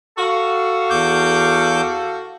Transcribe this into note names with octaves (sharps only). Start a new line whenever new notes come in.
F#4 A4 F5
E2 D6 G6